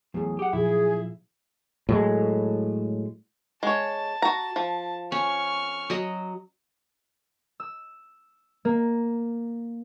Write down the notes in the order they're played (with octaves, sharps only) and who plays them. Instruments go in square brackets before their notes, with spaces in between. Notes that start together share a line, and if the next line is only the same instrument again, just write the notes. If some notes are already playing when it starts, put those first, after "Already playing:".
[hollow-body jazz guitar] E2 A2 [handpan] F#3 G#4
[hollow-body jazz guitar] G4 F#5
[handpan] A#2 F3 F4 [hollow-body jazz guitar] E4 [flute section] G#4
[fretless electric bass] A2 F#3 G#3
[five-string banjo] G#3 C#5 [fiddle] A5
[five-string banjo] F#4 A#5
F3
[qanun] C#4 [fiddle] C#6 F6
[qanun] F#3 D#5
[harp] E6
A#3